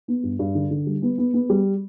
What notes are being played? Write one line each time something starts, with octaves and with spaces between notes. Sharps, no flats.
B3
G2
G2
D3
D3
G3
B3
B3
B3
G3